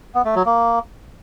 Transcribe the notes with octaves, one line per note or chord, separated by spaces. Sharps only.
B3
A3
F#3
A#3